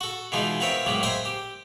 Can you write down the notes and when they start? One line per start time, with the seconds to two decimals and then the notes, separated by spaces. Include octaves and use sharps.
0.01 F#4 A4
0.32 B2 E3 G#3 D#4 F4
0.60 B3 C4 F4 A#4 C#5 E5
0.86 A2 F#3 G#3 A#3 B3
1.03 C5 D#5 E5 G5 G#5 A#5
1.25 G4